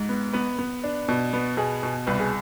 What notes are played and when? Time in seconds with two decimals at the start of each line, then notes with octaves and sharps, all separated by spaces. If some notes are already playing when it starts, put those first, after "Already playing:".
Already playing: G#2
0.09 B3
0.33 B3 B4
0.59 B3
0.84 D4
1.08 B2
1.33 B3
1.57 B2 G#4
1.83 B2
2.07 C2 B4
2.20 G#4